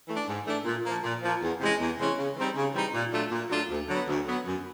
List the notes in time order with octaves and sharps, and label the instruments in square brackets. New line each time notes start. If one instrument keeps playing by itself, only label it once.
[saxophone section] E3 A3 D4
G#2
E3 A3 D4
A#2
F3 A#3
A#2
F3 A#3
E2
C3 E3 G#3 C#4
E2
C3 E3 G#3 C#4
C#3
E3 G3 C4 D#4
C#3
E3 G3 C4 D#4
A#2
F#3 A3 D4 F4
A#2
F#3 A3 D4 F4
D2
D3 F#3 B3
D2
D3 F#3 B3
F#2